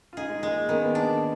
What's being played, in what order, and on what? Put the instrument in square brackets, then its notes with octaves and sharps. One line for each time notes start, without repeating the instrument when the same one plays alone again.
[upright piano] F4
[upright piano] D#4 [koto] G#4
[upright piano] G#3
[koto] G#3 [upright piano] A#3
[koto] D#3 [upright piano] B3
[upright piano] A#3
B3
[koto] D4